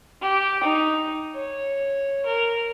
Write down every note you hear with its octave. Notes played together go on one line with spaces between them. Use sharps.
G4
D#4
C#5
A#4